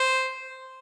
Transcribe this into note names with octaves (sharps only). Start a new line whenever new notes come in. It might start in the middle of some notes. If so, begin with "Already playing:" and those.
Already playing: C5